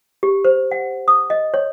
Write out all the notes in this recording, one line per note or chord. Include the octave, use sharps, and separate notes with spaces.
G4
C5
F#5
D#6
D#5
C#5